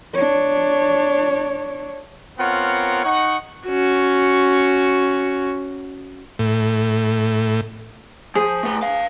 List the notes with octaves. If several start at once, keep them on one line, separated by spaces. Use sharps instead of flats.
D4 C#5
B3 C4 F4 A#4 C#5 F#5
D#4 F#5 C#6
C#4 F#4
A2
F3 G#4
A3 B4
B4 F5